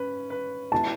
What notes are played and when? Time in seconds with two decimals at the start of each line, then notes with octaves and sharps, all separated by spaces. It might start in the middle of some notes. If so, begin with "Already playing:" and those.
Already playing: C#4 B4
0.30 B4
0.72 E4 A5